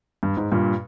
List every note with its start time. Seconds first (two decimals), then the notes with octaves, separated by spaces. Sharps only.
0.23 G2
0.37 G#2
0.52 G2 A#2